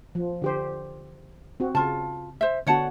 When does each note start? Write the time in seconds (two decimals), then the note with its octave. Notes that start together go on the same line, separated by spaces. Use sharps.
0.15 F3
0.42 D3 G4 C5
1.60 C4 F#4
1.75 C#3 F4 A5
2.41 C5 E5
2.67 D3 B3 F#4 C#5 F#5 A5